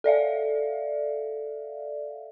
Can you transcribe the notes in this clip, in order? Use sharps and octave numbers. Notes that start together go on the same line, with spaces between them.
A4 D5 E5 F5